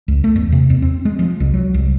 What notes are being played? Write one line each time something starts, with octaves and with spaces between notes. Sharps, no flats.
C#2
A3
E2
C3
E2
C4
G#3
F3
C2
F#3
C2